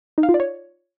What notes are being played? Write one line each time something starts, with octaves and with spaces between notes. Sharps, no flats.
D#4
F5
F4
D5
C#5